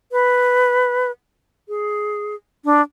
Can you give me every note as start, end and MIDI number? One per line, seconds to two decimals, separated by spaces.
0.12 1.11 71
1.69 2.35 68
2.65 2.82 62